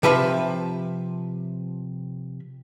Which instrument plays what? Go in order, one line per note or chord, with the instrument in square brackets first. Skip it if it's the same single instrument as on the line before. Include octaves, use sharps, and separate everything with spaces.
[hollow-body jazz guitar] C3 F3 B4 E5 B5